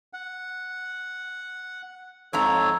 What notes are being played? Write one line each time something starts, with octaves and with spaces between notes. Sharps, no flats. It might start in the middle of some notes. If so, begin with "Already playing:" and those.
F#5
F2 G#2 A4 C#5 A#5